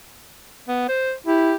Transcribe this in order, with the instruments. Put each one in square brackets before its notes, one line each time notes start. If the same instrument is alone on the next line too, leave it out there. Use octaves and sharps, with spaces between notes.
[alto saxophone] B3
C5
[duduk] E4 [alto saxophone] G4